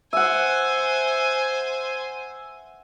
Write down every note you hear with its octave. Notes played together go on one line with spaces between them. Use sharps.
C5 E5 F#5 G#5